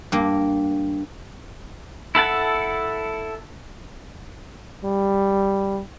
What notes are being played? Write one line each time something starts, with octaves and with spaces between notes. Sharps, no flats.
G2 A#3
E4 A4 F#5 A5
G3